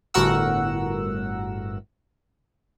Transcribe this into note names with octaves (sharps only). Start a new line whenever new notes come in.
G1 A2 F#4 A#4 F#5 E6